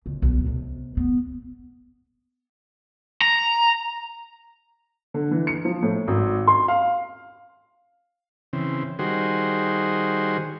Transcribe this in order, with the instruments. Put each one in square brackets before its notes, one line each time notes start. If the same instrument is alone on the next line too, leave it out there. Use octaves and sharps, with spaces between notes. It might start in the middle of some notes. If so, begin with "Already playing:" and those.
[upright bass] C#2
B1
B1 C3
B3
[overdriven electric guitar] A#5
[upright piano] D3
E3
C#7
F3
A2
G#1
C6
F5
[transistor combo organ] C#3 E3 C4
D#3 G3 F#4 G#4 C5